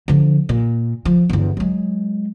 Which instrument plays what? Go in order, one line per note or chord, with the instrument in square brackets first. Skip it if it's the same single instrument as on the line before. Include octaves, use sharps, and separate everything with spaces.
[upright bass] D3 F3
A#2
F3
G1 E2
F#3 G#3